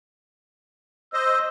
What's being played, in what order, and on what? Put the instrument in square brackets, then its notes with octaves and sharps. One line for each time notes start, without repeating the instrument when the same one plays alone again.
[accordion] C5 D#5 [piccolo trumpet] E6